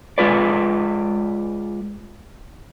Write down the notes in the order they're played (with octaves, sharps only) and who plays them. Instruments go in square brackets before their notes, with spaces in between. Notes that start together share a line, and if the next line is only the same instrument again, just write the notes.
[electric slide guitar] G#3 F4 B4 D5